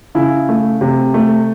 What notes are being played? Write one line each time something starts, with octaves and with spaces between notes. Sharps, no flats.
C#3 E4
A3
C3
A3